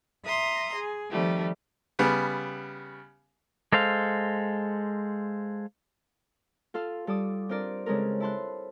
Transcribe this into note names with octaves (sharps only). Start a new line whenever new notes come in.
E5 A#5 C6 D#6
G#4
D#3 F3 G3 A3 C4
C#3 G3 B3
G#3 A4 C5 F5
F4 A4 F5
G3 A4 D5 D6 D#6
C4 D4 F4 A#4 D5
C#3 G#3 C4 A4 A#4
E4 A5 C6 F#6